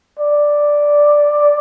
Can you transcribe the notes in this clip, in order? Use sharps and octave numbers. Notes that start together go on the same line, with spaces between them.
D5